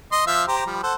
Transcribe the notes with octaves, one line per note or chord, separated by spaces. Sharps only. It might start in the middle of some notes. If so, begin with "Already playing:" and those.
D#5 C6
F3 E5 F5
G4 C5 A#5
F3 G3
A4 C5 F#5